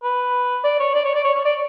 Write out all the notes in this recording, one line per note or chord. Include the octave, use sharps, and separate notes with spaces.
B4
D5
C#5
D5
C#5
D5
C#5
C#5
D5